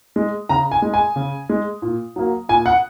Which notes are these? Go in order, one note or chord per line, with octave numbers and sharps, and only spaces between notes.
G#3
C#3 A#5
G#5
G#3
G#5
C#3
G#3
A#2
F#3 A#3
A#2 G#5
F#5